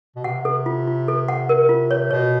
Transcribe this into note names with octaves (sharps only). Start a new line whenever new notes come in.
B2
C3 F#5
A4
F4
F4
A4
F#5
A#4
F4
C#5
B2 C#5